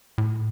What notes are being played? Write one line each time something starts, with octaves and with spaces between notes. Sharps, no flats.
A2